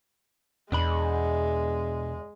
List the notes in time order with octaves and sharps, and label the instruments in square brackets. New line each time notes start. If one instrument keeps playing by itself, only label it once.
[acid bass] E2 [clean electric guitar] B2 D4 B5 [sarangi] G#3